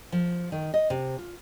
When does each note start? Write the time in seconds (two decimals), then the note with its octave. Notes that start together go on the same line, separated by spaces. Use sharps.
0.12 F3
0.52 D#3
0.74 D#5
0.90 C3
1.19 F4